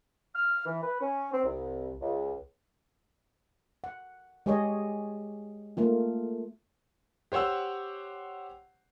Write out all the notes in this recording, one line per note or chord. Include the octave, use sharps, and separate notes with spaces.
F6
E3
B4
C#4
C4
C2
C#2
F#5
G#3 G4 G#4 C#5 D#5
A3 A#3 F4
G4 C5 C#5 F#5 E6